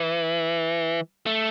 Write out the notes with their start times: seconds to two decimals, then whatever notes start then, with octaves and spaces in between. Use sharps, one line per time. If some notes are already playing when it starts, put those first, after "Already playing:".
Already playing: E3
1.26 A3